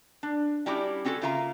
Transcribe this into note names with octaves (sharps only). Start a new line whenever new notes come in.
D4
G3 C#4 D4 E4 F#4 G4
C4 C#4 F#4 G4 A4
C#3 A#3 F4 E5 F5 A#5